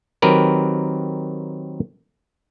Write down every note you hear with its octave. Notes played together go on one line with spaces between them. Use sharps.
D#3 F#3 C4 G4 A#4 B4